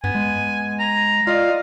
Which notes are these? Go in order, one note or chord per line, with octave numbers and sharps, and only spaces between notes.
G2 B3 G#5
G#3
A#5
F4 D5 D#5 F5